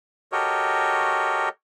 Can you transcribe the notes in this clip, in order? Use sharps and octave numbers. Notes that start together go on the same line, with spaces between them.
F#4 G4 A4 A#4 C#5 D#5